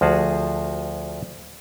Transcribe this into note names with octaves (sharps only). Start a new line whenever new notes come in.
D2 F3 F#4 G#4 A5